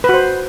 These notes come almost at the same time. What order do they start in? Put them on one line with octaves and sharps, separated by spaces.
B4 F#4 C5